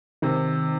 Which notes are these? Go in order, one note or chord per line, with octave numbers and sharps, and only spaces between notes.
C3 D#3